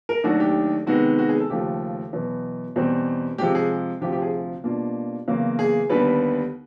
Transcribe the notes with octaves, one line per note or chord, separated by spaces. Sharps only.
A#4
D#2 D#3 F#3 A3 D4 F#4
G4
C3 D#3 G#3 B3 F#4
F#4
G#4
A4
D#2 C#3 F3 A3 G4
E2 B2 F#3 B3
E2 B2 G3 C4
C3 F3 G#3 G4
G#4
D2 C3 F3 G4
G4
G#4
B2 G3 A#3 D4 F4
E2 C#3 F#3 A#3
G#4
D#2 D3 G3 B3 B4